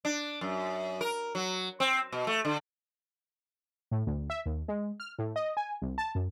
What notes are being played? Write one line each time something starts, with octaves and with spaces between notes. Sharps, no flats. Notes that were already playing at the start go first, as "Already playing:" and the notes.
D4
F#2
A#4
F#3
C4
B2
A3
D3
A2
D2
E5
D#2
G#3
F6
A2
D#5
G#5
C2
A5
F#2